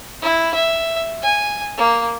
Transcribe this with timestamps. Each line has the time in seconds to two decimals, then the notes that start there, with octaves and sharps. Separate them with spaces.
0.22 E4
0.55 E5
1.22 G#5
1.78 A#3